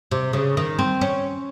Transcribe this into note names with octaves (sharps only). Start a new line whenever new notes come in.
C3
C#3
D#3
C4
C#4